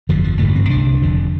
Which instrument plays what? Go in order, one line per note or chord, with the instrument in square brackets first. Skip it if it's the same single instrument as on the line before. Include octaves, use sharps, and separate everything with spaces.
[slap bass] G1 F2 D3 F3
F3
A1 G2 D3 A3
C4
C2 C3 D4
F1 F2 D3